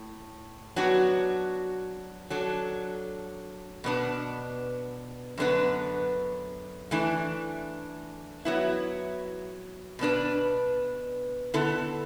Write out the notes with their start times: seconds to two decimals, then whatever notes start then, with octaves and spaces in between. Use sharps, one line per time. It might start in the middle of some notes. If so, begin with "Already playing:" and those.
Already playing: A2
0.76 F#3 B3 D4 F#4
2.30 F#3 D4 A4
3.84 B2 B3 D4
5.38 F#2 D3 B3 D4 B4
6.91 E3 A3 D4
8.45 F#3 B3 E4
9.99 B2 B3 D4 B4
11.54 D3 B3 E4 A4